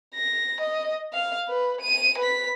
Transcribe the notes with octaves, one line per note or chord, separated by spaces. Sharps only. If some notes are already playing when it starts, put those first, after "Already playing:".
A#6
D#5
F5
B4
D#7
B4 B6